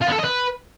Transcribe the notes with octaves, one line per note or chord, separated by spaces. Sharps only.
F4
B3
A4
D#5
B4